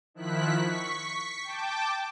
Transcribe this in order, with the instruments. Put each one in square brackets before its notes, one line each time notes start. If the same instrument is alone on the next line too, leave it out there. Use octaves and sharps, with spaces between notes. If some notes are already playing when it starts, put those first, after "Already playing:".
[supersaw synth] D#3 F3 E4 F#6 B6
C#6 B6
G5 A5 D6